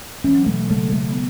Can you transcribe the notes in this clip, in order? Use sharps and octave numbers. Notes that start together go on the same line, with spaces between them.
E3 C#4
F#3
B2 E3 A3
C#3 F#3 A3
A3
B3